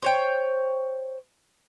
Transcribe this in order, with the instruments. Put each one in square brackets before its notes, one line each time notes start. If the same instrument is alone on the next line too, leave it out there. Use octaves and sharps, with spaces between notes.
[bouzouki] C5 C#5 G5